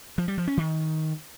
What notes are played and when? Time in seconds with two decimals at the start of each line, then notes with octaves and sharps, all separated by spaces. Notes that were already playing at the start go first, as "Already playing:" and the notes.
0.18 F3
0.28 G3
0.38 F3
0.47 C#4
0.57 D#3